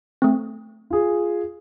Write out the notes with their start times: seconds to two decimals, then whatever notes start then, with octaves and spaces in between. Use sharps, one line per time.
0.22 A3 C4
0.90 F4 G#4